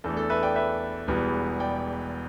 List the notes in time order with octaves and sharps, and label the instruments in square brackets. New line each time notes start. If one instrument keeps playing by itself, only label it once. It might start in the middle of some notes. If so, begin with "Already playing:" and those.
[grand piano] E2 E3 A3 D4 A4
A4
B4 E5
D5 G5
B4 E5
E1 E2 E3 G3 B3
D5 G5